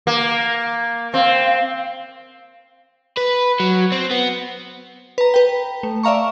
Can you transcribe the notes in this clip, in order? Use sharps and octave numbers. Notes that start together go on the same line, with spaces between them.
A#3
C4 F5
B4
F#3
C4
B3
B4 A#5
B4 G5
A3
D5 E5 F5 A#5 C#6